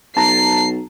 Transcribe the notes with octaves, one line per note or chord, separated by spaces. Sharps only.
B1 A5 A#5 C7